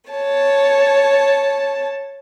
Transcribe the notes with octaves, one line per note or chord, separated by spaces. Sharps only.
C#5 A5